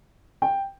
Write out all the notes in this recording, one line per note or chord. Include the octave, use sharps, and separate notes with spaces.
G5